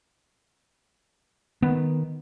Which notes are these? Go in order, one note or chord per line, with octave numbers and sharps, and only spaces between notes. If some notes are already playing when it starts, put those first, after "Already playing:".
D#3 B3